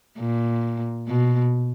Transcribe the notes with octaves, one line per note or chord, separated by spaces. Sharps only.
A#2
B2